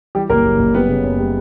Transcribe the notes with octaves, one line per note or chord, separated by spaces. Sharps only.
E3 G3 G4
F#1 A#3 A#4
F#1
F#1
G3 B3 B4
C#3
F#2
G3